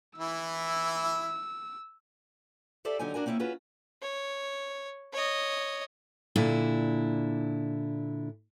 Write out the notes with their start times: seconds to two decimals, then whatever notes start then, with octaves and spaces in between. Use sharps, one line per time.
0.18 E3 E4 E6
2.85 G4 A4 C5 D5 E5
2.99 D3 F#3 D#4 G4 G#5
3.14 D4 F#4 A#4 G#5
3.26 A#3 C4 C#4 E4 E5
3.39 C#4 F4 F#4 G#4 B4
4.02 C#5
5.13 C#5 D#5
6.36 A#2 D3 D4 E4